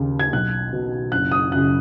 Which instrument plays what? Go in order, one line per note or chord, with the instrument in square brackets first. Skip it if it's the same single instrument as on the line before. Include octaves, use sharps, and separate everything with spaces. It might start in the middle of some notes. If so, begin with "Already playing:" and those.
Already playing: [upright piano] D#2 C#3
G#6
B1 F#6
B2
F#1 F#6
D#6
F#2 C#3 F#6